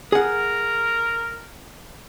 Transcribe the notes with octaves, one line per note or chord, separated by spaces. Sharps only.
G#4 A#4 F#5